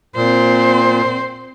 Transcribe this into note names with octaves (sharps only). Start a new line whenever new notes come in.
A#2 C4 C5